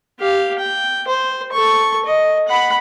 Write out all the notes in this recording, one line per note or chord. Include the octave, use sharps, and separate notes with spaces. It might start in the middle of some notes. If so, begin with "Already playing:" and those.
G4 F5
G5
C5
A4 C#6
D#5
F#5 B5